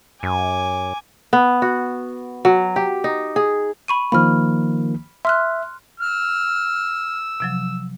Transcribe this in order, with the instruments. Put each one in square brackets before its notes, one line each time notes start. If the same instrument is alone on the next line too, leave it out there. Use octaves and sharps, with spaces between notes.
[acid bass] F#2 [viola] G#5 D6
[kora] B3
F#4
F#3
G4
D#4
G#4
[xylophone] B5 C#6 D#7
[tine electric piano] D#3 F3 A#3 [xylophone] B5 F6
[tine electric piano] E5 [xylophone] C6 F6 F#6
[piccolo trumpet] E6 [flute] F6
[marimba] C3 F3 F#3